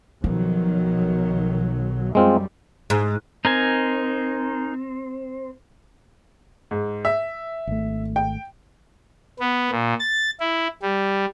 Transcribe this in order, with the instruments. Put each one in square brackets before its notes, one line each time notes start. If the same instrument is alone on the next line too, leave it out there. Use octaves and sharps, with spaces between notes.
[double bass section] B1 D#3 F#3 [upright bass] F3
[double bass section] F#2 G3 [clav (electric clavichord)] G#3 C4 F4
[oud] G#2
[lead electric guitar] C4 [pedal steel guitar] D#4 A#4 G#5
[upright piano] G#2
E5
[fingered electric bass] G#1 A3
[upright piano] G5
[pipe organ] B3
A#2
A6
E4
G3